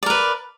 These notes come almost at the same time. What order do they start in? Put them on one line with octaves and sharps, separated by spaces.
D5 A#4 B4